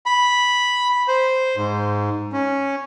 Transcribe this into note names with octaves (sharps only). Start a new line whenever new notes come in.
B5
C5
G#2
C#4